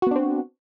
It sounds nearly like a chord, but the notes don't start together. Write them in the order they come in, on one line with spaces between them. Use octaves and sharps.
F#4 B3 D4 C4